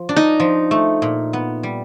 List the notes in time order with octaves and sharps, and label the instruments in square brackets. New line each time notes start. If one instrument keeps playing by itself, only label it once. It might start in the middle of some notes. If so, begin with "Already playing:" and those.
Already playing: [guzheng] F3
D4
[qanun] D#4
[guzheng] F3
A3
A#2
B3
G3